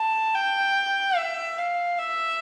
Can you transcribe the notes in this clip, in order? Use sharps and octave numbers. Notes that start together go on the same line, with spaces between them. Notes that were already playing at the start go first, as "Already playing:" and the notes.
Already playing: A5
G5
E5
F5
E5